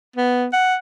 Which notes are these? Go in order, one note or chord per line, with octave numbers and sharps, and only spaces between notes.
B3
F#5